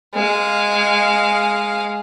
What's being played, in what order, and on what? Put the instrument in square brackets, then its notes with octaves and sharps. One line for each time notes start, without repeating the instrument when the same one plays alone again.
[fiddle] G#3 F5